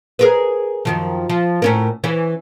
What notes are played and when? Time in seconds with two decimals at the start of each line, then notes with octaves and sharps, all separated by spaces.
0.19 G#4 A#4 B4
0.85 F#2 D#3 F3
1.30 F3
1.62 A2 C#4 A#4
2.04 E3 C#4